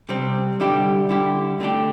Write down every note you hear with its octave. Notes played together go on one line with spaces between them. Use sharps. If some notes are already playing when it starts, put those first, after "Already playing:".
C3 G3 C4
D3 G3 E4 G4
D3 G3 E4 G4
D3 A3 D4 G4